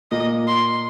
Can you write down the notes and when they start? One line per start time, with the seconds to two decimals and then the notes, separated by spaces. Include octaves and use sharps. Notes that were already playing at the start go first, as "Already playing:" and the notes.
0.12 A#2 A#3 D#5
0.48 C6